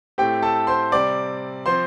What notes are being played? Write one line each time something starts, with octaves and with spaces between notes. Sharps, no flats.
A2 A3 C4 G4 G5
A4 A5
C5 C6
C3 G3 C4 D5 D6
F3 C4 C5 C6